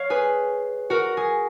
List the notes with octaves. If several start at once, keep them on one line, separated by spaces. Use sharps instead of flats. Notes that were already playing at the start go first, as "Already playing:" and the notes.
Already playing: C#5 F5
G#4 B4
F#4 A#4
G#4